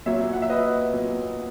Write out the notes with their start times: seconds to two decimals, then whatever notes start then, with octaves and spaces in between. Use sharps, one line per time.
0.06 A#2 F#3 A#3 C#5 E5
0.33 F#5
0.42 E5
0.50 B4 D#5
0.93 A#2 F#3 A#3